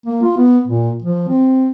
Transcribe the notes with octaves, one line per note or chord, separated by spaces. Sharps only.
A#3
F4
B3
A#2
F3
C4